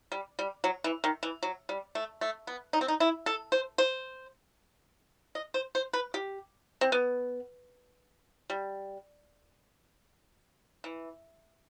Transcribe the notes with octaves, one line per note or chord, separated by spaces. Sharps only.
G3
G3
F#3
E3
D#3
E3
F#3
G3
A3
A3
B3
D#4
C4
D#4
E4
A4
C5
C5
D#5
C5
C5
B4
G4
C4
B3
G3
E3